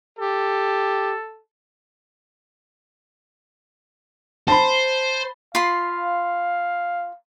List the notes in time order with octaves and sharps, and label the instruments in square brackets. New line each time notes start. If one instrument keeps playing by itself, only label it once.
[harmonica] G4 [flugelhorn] A4
[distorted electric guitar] C5 [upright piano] A5 B5
[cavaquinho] F4 B5 C6 [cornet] F5